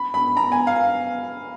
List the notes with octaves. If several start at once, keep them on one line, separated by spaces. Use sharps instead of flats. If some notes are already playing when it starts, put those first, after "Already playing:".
Already playing: B5
B5
A#5
G#5
F5